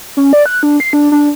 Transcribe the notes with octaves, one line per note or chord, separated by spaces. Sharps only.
C#4
D5
F#6
D4
C7
D4
D4